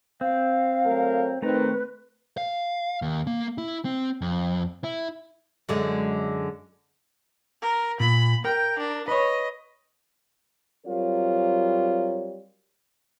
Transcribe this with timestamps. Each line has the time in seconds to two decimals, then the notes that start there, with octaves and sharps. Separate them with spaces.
0.21 C4 F5
0.85 F#3 A3 A#4
1.42 D#3 A3 C4 B4 A#5
2.37 F5
3.02 D#2
3.27 A#3
3.58 E4
3.85 C4
4.21 F2
4.84 E4
5.69 F#2 D3 G#3
7.62 A#4
8.00 A#2 B5
8.45 A#4 G5
8.79 D4
9.08 B4 C#5 D#5
10.87 F#3 G3 C4 F4 A#4 C#5